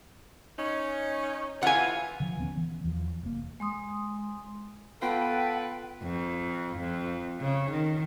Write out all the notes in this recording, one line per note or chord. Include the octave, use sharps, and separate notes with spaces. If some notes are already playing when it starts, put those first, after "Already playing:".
C#4 D#4
E3 F4 F#5 G#5
D3 F3
D#1 G2 B3 C#4
E3
E2 F3
F1 A#3
G#3 C6 D#6
B3 F4 A4 B4 F5 G5
F2
F2
C#3
D#3